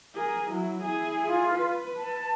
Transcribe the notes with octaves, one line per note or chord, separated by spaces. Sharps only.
G#4 A#4
F#3 E4
E4 G#4
F4
B4
A5